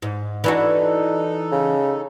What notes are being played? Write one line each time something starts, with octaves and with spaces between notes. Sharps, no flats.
G#2
E3 D4 D#4 F#4 A4
C#3